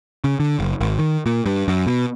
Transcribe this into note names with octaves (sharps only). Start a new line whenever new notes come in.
C#3
D3
F#1
G#1
D#3
A#2
G2
F#2
B2